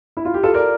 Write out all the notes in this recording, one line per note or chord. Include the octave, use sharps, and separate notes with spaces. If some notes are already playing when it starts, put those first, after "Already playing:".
E4
F4
G4
F4 A4
A#4 D5